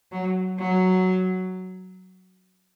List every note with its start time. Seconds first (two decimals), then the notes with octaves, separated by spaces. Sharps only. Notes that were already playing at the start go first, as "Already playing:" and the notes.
0.12 F#3
0.59 F#3